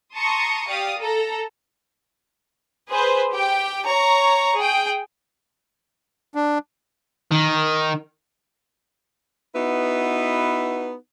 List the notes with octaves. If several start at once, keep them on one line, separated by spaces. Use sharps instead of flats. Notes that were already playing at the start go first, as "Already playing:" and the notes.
A5 A#5 C6 C#6 D#6
G4 D5 F5 D#6
A4 A#5
G#4 B4 C5
G4 G5
C#5 A#5 C#6
G#4 G5
D4
D#3
B3 D#4 E4 F#4 B4